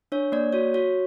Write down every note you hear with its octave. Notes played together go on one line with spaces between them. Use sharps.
D4 C#5
A#3 D5
F#4 C#5
F#4 C#5